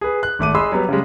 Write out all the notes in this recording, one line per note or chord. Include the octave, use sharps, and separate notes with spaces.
G#4 B4
F#6
G#1 A3 D6 D#7
G#4 D#5 B5 C6 E6
F#3 G3 B3
C#3 G3 G#3